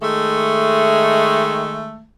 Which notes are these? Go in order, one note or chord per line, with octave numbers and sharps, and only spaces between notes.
D#3 G#3 A3